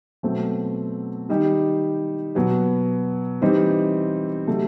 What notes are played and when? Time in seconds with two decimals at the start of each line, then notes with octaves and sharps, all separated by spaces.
0.23 B2 F#3 A3 C4
1.29 D#3 G3 D#4 G4
2.35 B2 F#3 B3
3.41 E3 G3 C4 D#4
4.47 C3 F#3 A3